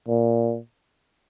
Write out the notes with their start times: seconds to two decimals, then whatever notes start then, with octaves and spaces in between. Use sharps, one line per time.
0.08 A#2